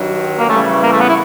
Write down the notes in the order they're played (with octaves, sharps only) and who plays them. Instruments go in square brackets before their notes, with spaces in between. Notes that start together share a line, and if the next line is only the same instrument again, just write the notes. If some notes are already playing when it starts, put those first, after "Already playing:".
Already playing: [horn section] G2 D#3 F#3
[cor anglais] A#3
[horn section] C#3 E3 G3 [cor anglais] A3
[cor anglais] A#3
A3
B3
E4